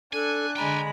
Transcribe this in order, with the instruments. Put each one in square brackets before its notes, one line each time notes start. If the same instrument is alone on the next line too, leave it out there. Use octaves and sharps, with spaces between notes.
[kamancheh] D4 F#6 [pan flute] A4 [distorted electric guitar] G#5
[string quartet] D3 G#3 B5 [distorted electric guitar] G5 G#5 [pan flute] A#5